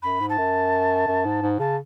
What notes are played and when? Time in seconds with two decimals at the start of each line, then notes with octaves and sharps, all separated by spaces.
0.02 F#2 B5
0.20 G#2
0.29 A5
0.38 F#2
1.07 F#2
1.25 G#2
1.42 G#2
1.59 C#3 A5